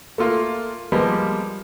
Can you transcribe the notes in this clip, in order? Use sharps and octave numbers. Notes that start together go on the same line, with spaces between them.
A3 A#3 F4
F3 G3 G#3 A#3 B3